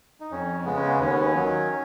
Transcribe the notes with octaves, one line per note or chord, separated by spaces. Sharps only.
D#4
F2 C#4
C#3 G#3 B3
C#4
B3
D#2 C#4
B3
C#4
D#3 F#3